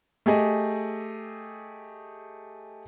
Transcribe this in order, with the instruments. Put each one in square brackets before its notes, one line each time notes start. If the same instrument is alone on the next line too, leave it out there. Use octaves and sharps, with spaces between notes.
[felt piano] A3 G4 G#4 D#5